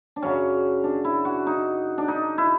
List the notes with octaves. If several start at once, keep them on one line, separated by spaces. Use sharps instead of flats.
D4
F#2 C#3 F#3 C#4
D4
E4
F#4
D#4
D4
D#4
E4